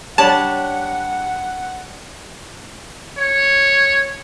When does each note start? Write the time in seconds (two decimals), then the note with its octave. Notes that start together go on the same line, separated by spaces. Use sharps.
0.18 G3 D4 C#5 F#5 A5
3.17 C#5